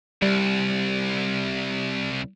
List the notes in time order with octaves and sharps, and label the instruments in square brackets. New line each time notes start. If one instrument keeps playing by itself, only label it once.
[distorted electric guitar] C2 [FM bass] G3